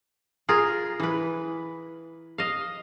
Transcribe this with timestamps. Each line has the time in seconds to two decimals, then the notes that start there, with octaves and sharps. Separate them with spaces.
0.49 F4 G#4 A#4
1.00 E3 B4
2.38 D#5 F5